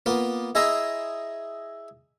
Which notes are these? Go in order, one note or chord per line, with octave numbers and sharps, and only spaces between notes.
A#3 B3 F4
E4 G#4 D#5 E5 A#5 C6